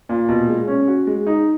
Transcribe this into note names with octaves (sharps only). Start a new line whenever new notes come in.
A#2
B2
G#3
C#4
F#4
G#3
D#4